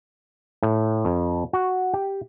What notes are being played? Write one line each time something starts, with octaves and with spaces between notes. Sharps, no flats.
A2
F2
F#4
G4